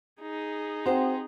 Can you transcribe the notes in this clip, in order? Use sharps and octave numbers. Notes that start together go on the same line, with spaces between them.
D#4 G#4
C4 F#4 C5 G5